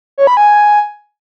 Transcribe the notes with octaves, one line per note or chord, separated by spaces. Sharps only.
C#5
B5
G#5